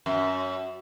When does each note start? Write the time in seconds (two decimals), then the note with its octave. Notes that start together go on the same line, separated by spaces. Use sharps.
0.06 F#2